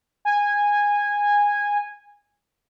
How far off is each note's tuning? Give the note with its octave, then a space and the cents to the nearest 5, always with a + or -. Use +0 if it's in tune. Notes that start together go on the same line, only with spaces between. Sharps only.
G#5 -15